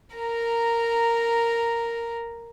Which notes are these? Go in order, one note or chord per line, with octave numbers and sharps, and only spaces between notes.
A#4 A#5